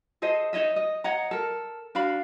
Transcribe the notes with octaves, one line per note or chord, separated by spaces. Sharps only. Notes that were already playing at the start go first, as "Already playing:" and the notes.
G#4 A4 C5 D#5
D#4 C#5 D#5 E5
D#5
C#5 D#5 F#5 A#5
A4 A#4
D4 F#4 F5 B5